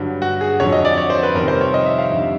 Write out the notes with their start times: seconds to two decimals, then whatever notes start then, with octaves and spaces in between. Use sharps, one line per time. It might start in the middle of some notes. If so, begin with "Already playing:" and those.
Already playing: G2 D3 F#3
0.22 F#4
0.41 G#4
0.60 F2 D3 F#3 C#5
0.72 D#5
0.85 D5
0.98 C#5
1.10 C5
1.23 B4
1.35 F2 C3 D#3 G3 A#4
1.48 C5
1.61 C#5
1.74 D#5
1.86 E5
1.98 F5
2.11 F2 D3 G3 E5